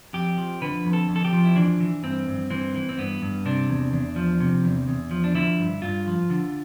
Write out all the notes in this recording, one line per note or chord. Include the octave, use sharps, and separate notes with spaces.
F2 G4
F3
D3 B4
F2
A4
F2
A4
G4
F3
E4
E3 D4
E3
G2 C4
G2
E3 C4
E3
C4
G2 B3
G2
C3 D4
E2
E2
F3
C3
E2
E2
F3
D4
D3 E4
G2
G2 F4
F3
D3